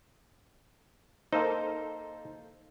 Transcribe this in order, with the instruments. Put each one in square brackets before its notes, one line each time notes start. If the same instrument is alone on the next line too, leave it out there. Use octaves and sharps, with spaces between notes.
[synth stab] A#3 A4 C5 [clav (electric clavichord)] D#4